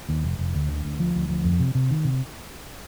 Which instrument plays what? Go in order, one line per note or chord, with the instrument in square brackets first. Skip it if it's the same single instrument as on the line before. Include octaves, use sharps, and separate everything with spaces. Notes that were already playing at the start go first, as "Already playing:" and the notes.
[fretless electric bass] D#2
F1
F1
D2
D3
D2
F3
D2
F3
F2
C3
C3
D#3
C3